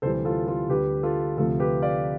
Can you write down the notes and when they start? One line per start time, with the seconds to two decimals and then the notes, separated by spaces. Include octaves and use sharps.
0.02 D2 C3 E3 G3 A4 C5
0.25 F4 A4
0.47 F4 A4
0.69 D2 D3 G3 G4 B4
1.03 F4 A4
1.37 D2 C3 F3 A3 F4 A4
1.60 G4 B4
1.82 D5 F5